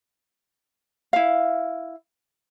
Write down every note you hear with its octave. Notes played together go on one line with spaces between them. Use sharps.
E4 F5